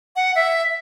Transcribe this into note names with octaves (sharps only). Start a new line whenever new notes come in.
F#5
E5